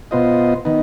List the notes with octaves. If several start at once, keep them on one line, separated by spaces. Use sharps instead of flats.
B2 B3 F4 C5 D#5
D#3 B3 D#4